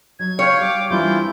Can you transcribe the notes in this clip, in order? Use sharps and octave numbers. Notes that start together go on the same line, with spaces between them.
F#3 D#4 G#6
C#5 F5 G5
G3 D6
E3 G3 C4 D4 E4 F4 G6